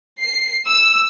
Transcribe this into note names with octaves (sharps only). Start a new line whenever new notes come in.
C7
E6